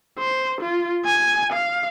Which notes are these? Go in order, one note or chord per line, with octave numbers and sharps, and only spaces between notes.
C5
F4
G#5
F5